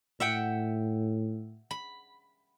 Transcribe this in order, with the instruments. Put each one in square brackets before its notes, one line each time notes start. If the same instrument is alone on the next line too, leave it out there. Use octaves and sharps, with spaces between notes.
[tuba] A2 [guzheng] E5 F#5 G5
[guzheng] B5